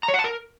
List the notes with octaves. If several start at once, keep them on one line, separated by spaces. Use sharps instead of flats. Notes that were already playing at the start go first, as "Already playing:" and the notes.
A#5
C#5
F#5
A5
A#4